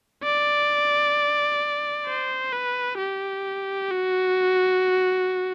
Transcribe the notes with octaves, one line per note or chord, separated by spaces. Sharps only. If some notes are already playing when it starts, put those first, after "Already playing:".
D5
C5
B4
G4
F#4